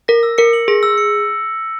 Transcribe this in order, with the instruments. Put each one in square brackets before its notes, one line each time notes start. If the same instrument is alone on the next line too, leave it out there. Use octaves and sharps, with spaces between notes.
[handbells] A#4 [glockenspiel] A#6
[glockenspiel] E6
[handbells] A#4 [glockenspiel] C#7
[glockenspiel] F#7
[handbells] G#4 [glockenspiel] A#6
[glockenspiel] E6
C#7